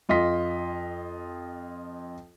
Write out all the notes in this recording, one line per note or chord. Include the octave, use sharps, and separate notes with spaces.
F2 F4 D#5 C6 B6